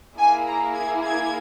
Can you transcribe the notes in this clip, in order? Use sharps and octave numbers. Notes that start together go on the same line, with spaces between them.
A#3 E4 G#4 G#5
A#5
G#6
G#6